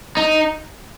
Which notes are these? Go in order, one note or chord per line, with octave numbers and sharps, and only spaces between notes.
D#4